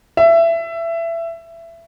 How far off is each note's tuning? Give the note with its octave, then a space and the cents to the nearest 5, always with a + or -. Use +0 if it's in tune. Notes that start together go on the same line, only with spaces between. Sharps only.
E5 +20